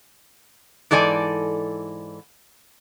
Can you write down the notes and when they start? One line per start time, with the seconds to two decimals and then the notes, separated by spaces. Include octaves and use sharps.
0.91 G#2 E3 A4 D5 G#5